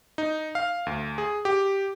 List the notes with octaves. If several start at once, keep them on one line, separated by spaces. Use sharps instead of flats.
D#4
F5
D2
G#4
G4